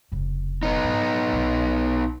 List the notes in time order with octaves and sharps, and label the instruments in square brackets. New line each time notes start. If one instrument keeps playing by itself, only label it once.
[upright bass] F1 C#3
[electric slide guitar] B3 D#4
[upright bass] G#2
B1